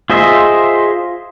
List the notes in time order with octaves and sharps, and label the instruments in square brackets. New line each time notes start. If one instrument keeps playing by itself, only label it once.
[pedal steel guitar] F4 G#4 C5 D#5 E5